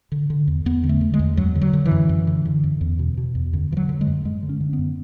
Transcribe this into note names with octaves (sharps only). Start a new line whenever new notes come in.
D3
D3
E2
E2 B3
D3
A3
D3
G#3
E2
F#2 F#3
D3
F#3
D3
E3
F#2
F#2
D3
D3
F#2
E2
B2
B2
E2
F#2 D3
D3 E3
F#3
D3
G#3
F#2
F#2 G#3
D3
C#4
D3
B3
F#2